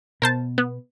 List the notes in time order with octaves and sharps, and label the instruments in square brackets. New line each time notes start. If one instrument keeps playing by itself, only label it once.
[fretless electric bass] B2 [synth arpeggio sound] A#4 C5 A5
[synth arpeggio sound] B3